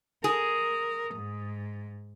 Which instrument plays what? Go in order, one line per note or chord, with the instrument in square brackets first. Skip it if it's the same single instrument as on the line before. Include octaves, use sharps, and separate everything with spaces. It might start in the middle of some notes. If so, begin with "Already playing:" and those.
[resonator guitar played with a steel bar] G#4 [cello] A#4
[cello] G#2